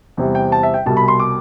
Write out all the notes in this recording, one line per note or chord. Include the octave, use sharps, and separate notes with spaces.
E2 C3 G3
G5
A5
E5
G5
C2 B2 G3 A5
B5
C6
D6